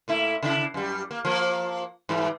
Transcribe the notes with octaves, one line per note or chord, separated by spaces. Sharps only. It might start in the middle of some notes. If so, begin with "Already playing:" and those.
A#2 A3 E4
C#3 D4 E4
F#2 G3
A#3
F3 A#3
G#2 E3 G3